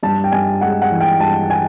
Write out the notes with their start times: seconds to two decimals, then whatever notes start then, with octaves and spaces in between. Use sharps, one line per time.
0.03 G2 A5
0.24 G5
0.32 G2 G#5
0.61 G#3 F#5
0.82 F#5
0.91 E3
1.01 G5
1.20 G2 A5
1.50 G#5